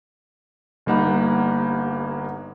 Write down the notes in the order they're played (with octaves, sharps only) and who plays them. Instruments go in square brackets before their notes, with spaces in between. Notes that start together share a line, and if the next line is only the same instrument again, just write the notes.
[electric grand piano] G1 G3 A#3 D#4 F#5 B5